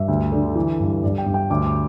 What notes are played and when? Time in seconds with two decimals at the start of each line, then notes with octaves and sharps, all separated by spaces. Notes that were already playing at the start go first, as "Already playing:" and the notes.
Already playing: G2 E5
0.08 D2
0.32 D3
0.55 E3
0.80 G2
1.04 G2 D5
1.18 G5
1.26 G2
1.34 G5
1.50 D2 D6
1.66 D6